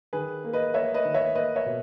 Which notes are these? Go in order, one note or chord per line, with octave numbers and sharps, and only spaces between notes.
D#3 G#4 B4
A#3
B4 D#5
A#3 C#5 E5
B4 D#5
D#3
C#5 E5
A#3 B4 D#5
C#5 E5
B2